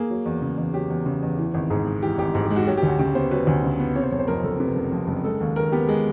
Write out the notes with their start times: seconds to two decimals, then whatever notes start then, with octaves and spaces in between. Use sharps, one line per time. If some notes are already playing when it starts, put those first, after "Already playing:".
Already playing: A#3 G#4
0.10 F#3
0.25 E2
0.42 C#3
0.58 E2
0.73 F#3 G4
0.90 E2
1.06 C#3
1.22 E2
1.38 E3
1.54 G#1
1.70 G#2 G#4
1.87 G#3
2.02 E3 G4
2.18 G#1 G4
2.35 G#2 G#4
2.45 G4
2.51 G#3
2.56 F#4
2.67 F#3 G4
2.77 G4
2.83 D2
2.88 F#4
2.99 C#3 G4
3.15 B3 C5
3.31 F#3 B4
3.47 D2
3.63 C#3
3.80 B3
3.95 C3 C#5
4.04 C5
4.11 F#1 C#5
4.19 C5
4.28 F2 A#4
4.43 F#1 A4
4.60 C3 B4
4.76 F#1
4.92 F2
5.07 F#1
5.24 G#3 A4
5.41 D#2
5.56 D#3 A#4
5.72 B3 G4
5.88 G#3 G#4